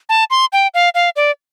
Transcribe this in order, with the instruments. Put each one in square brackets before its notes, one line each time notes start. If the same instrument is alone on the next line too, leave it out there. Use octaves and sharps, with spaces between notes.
[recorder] A5
C6
G5
F5
F5
D5